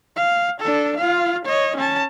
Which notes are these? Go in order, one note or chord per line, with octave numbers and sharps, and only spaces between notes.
F5
D4 A4
F4 F5
C#5 D#5
C#4 A5